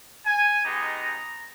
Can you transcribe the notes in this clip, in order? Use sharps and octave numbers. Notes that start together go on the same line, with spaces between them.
G#5
G#3 B3 D#4 G4 A#5